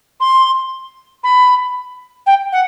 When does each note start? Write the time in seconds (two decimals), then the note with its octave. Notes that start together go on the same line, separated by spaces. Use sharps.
0.20 C6
1.24 B5
2.26 G5
2.52 F#5